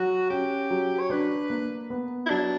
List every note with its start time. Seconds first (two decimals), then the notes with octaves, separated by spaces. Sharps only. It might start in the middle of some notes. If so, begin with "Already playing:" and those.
Already playing: F#3 F#4
0.30 C#4 G4
0.71 F#3
0.99 C#5
1.10 D4 B4
1.50 A#3
1.90 B3
2.26 E4
2.30 F#3 D4